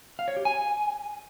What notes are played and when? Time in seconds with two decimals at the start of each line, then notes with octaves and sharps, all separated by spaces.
0.19 F5
0.28 C#5
0.37 G4
0.45 G#5